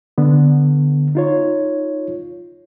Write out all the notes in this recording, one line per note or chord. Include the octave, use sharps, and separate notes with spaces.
D3 B3
D#4 F4 C#5